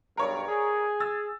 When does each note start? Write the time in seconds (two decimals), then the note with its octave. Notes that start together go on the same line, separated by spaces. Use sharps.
0.17 B1 G2 A#4 C#5 D5
0.48 G#4
1.00 E6 A6